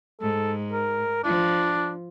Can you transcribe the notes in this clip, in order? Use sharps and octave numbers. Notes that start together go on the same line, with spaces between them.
G#2 A4
A#4
F3 D4